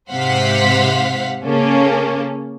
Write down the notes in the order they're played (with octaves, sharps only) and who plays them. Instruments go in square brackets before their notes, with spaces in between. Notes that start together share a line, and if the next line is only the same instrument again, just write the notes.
[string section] G#2 C3 C5 F5 F#5 B6
C#3 A#3 C#4 A4